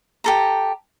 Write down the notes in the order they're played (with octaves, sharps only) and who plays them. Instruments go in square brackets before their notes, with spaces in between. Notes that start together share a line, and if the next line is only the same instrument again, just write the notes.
[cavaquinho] G4 A4 A#5